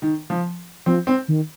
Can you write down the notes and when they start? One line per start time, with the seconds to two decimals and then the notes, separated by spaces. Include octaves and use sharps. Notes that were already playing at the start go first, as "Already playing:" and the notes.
0.02 D#3
0.30 F3
0.86 F3 C4
1.07 C4
1.28 D#3